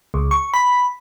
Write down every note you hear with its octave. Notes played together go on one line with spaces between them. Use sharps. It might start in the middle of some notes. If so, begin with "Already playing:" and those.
C#2
C#6
B5